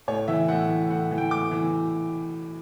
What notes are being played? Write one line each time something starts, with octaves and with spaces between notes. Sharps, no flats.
A2 C#5
E3 E5
A2 F#5
E3
A2 F#5
E3
G5
A2 D6
E3